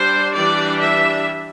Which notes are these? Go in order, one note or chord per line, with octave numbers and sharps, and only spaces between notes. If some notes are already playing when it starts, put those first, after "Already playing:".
Already playing: G3 D4 C5
E3 G3 D4 D5
E5